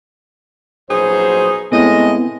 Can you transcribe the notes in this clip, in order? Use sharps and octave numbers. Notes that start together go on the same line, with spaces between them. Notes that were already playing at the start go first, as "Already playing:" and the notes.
A#1 B2 F#3 D#4 G#4 C5
A2 G#3 B3 C4 E4 D#5